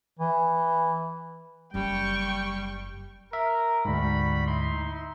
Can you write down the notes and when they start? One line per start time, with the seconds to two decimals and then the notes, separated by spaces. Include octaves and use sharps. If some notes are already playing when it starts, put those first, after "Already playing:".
0.19 E3
1.74 F#1 F#2 G3 G5 C#6
3.33 A#4 E5
3.85 D2 G#2 G3 F#4 B5
4.47 D#4 E4 C6